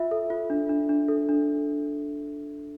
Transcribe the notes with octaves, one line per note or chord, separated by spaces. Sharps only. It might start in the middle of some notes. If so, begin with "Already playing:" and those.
Already playing: F4 E5
A4
F4
D4
D4
D4
A4
D4